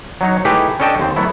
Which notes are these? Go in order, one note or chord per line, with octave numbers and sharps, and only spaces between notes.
F#3 D#4 C#5
A3 D#4 E4 G4 G#4 B4
C#4 D4 A4 D#5 G5 A5
D#2 C4
F#3 A3 B3 E4